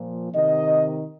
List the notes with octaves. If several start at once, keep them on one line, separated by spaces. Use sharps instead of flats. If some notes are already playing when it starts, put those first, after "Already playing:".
Already playing: A#2 F3
C3 D#3 D#5